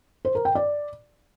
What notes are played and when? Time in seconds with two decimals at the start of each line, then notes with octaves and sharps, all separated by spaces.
0.25 C5
0.35 A#4
0.45 G5
0.55 D5